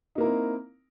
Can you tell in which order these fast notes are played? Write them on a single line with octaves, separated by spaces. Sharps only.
D#4 A#3 A#4 E4 C4